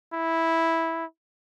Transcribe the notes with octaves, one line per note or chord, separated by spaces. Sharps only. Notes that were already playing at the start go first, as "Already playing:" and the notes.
E4